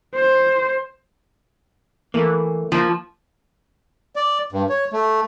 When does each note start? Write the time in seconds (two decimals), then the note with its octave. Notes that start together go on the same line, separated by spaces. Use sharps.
0.15 C5
2.14 E3 A3 A#3
2.72 F3 A#3
4.16 D5
4.52 G2
4.69 C#5
4.93 A3